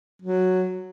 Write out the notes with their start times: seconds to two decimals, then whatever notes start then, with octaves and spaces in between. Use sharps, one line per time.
0.22 F#3